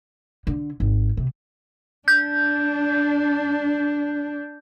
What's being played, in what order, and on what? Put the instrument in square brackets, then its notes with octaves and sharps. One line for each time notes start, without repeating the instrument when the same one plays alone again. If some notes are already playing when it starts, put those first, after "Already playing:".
[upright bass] D3
G#1
C3
[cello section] D4 [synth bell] G6